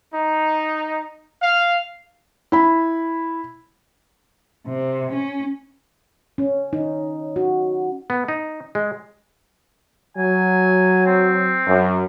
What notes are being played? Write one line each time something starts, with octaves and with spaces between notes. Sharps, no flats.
D#4
F5
E4 B5
C3
C#4
C#4
D#4
F#4
B3
D#4
G#3
F#3 G#5
C4
F#2